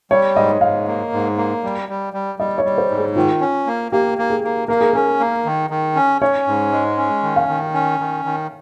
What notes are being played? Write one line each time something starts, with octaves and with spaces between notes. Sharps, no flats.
G3 C#5
G#2 D#5
G#2 F5
A#3
G#2
A#3
G3
G3
G3
G3 D#5
C#5
G3
C5
G#2
G#4
D#3 F4
C#4
A#3
A#3 G4
A#3
G#4
A#3
A#3 A#4
G#4
C#4 A#4
A#3
D#3
D#3
C#4
C#4 C#5
G#2
G#3
C#4
D#3
F5
D#3
C#4
D#3
D#3